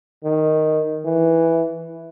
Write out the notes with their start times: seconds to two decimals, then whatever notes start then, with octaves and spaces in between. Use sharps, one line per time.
0.24 D#3
1.05 E3